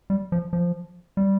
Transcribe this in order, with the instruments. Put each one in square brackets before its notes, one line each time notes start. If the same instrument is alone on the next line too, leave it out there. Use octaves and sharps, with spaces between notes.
[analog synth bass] G3
F3
F3
G3